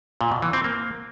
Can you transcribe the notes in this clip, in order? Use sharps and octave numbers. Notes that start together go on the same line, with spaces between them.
A#2
B2
E3
C4
A#3